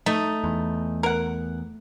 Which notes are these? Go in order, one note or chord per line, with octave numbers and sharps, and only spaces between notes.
A3 D#4
E2
A#4 F#5